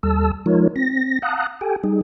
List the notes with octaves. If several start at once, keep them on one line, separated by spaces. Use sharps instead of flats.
D#2 G3 A4 A5 E6
F3 G#3 D#4 F4 A#4 C#5
C4 A#6
F5 F#5 A5 A#5 D#6 F#6
G4 A4 G5 G#5
G3 D#4 G#4